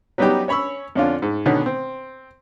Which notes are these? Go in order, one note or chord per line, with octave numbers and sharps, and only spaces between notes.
F#3 G3 B3 C#4 D#4 G4
C#4 C#5 B5 C#6 E6
F2 D3 C#4 D4 F4
G#2
B2 D3 D#3 B3 C#4
C4